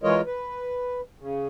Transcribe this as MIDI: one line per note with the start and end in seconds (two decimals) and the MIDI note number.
0.03 0.21 52
0.03 0.21 56
0.03 0.21 65
0.03 0.21 70
0.03 0.21 73
0.03 0.21 75
0.26 1.01 71
1.20 1.47 49